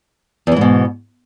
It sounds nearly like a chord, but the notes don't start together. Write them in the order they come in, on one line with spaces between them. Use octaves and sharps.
E2 E3 G#2 B2